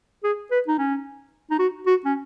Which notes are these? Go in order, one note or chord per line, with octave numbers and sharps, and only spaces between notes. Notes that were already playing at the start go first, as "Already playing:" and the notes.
G#4
B4
D#4
C#4
D#4
F#4
F#4
C#4